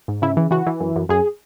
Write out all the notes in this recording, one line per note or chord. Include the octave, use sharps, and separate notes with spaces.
G#2
C#3 E4
E3
E3 F#4
E3
F#2
F#2
F#2 G#4